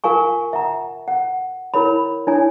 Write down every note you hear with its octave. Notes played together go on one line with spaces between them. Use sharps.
F4 A#4 F5 G#5 C#6
E5 F#5 A#5
F#5
E4 A#4 C#5 B5
D4 E4 C#5 G#5